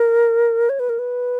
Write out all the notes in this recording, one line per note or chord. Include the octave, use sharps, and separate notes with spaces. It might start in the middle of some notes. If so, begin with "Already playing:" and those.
Already playing: A#4
C#5
B4
A#4
B4